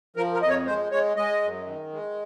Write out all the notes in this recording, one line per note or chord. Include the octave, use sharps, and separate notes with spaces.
F3 A#4
A#4
F2 D#5
C#5
G#3 C5
G#3 C#5
G#3 D#5
F#2
D#3
G#3